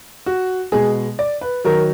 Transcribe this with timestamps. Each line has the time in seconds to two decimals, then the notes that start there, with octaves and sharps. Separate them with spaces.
0.26 F#4
0.72 B2 G#3 G#4
1.19 D5
1.41 B4
1.65 D#3 F#3 A#4